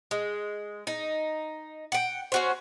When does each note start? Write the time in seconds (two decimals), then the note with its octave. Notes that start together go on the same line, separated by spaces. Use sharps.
0.11 G#3
0.87 D#4
1.92 F#5 G5
2.32 C#4 F#4 C5